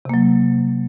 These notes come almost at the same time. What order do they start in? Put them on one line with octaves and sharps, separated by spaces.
C3 A#3 F#3